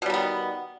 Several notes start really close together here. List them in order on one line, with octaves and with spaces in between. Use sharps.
B2 G3 D#3 B3